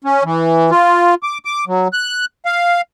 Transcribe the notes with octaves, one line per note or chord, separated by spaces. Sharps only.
C#4
E3
F4
D6
D6
F#3
F#6
F5